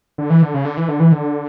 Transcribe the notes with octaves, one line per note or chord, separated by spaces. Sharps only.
D3
E3
D3
C#3
D3
E3
D3
E3
D3